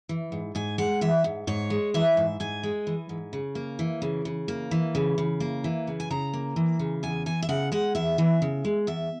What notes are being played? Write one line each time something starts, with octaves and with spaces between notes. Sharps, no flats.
E3
G#2
G#2 G#5
G#3 F#5
E3 E5
G#2
G#2 C#5
G#3
E3 E5
G#2
G#2 G#5
G#3
E3
G#2
C#3
A#3
E3
C#3
C#3
A#3
E3
C#3
C#3
A#3
E3
C#3
G#5
C#3 A#5
A#3
E3
C#3
E2 G#5
E3 G#5
E5
C#3 F#5
G#3 F#5
E2 E5
E3
C#3
G#3
E2 E5